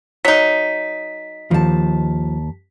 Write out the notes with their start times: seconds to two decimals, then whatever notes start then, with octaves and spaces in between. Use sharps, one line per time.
0.25 F#3 D#4 B6
1.51 D#2 F3 A5